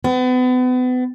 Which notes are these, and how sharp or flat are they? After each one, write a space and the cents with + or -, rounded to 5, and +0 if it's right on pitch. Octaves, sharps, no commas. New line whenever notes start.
B3 +35